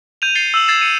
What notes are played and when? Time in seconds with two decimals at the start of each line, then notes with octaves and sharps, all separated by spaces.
0.22 G6 D#7 F7
0.35 A6 C7 C#7 G7
0.54 E6 E7 F#7
0.68 G#6 A6 C7 E7
0.81 C#7 D#7